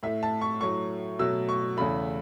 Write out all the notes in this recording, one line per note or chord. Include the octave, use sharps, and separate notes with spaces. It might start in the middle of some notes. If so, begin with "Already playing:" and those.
A2 A3 E5
A5
C#6
A2 F#3 A3 C#6
B2 F#3 A3 E6
C#6
E2 C#3 A3 B5